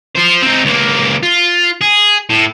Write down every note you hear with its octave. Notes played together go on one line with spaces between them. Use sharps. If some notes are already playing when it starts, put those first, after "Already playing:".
F4 C5
C4 D#4
C#2 A#3
F4
G#4
A2